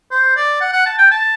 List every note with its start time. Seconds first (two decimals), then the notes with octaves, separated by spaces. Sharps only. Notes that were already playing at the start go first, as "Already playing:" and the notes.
0.11 C5
0.36 D5
0.61 F#5
0.73 F#5
0.86 A5
0.98 G5
1.11 A5